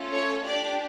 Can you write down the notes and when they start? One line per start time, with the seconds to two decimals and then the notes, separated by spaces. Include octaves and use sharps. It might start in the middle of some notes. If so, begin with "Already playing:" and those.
Already playing: A3 C#4 F4 A4
0.12 C#5
0.45 D4 G4 D5